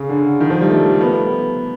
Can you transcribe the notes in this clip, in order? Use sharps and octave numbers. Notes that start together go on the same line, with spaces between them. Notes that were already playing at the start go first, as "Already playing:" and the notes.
Already playing: C#3
D3
D#3
F3
G3
A3
B3